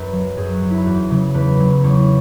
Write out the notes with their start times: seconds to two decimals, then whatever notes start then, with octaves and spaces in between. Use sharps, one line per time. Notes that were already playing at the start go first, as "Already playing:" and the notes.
Already playing: F#2 B4
0.13 F#3
0.37 F#2 G#4
0.54 F#4
0.62 F#3
0.70 E4
0.86 E2 F#4
1.10 C#3 F#3
1.34 E2 B4
1.59 C#3 F#3
1.83 E2 C#5
1.99 E4